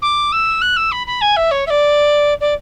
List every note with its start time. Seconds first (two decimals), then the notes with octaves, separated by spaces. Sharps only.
0.02 D6
0.32 E6
0.61 F#6
0.76 E6
0.92 B5
1.07 B5
1.21 G#5
1.36 E5
1.51 C#5
1.67 E5
1.70 D5
2.41 D5